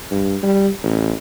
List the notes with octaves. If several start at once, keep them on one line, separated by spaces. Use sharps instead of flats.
G2
G3
A1